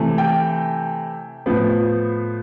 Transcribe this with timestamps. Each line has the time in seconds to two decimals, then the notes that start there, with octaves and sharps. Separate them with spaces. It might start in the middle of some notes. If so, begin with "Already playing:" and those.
Already playing: C3 E3 A3
0.18 G5
1.46 A2 F3 B3